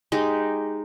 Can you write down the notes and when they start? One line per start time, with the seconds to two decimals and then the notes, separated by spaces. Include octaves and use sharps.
0.12 G#3 D#4 G4